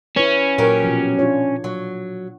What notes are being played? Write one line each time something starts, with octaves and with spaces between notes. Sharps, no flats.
C#4 E4 B4
A#2 F#3 G4 A#4 C#5
B2 F3
D4 F4 C#5
F#3